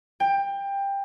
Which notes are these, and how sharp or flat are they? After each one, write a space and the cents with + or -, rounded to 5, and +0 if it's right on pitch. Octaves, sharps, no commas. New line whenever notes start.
G5 +20